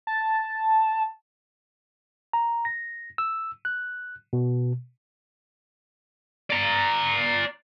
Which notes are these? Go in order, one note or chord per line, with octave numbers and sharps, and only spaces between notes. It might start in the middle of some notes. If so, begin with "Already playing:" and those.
A5
A#5
A#6
E6
F#6
B2
D5 A#5